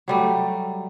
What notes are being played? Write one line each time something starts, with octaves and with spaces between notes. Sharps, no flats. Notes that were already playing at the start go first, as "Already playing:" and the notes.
F#3 G3 A3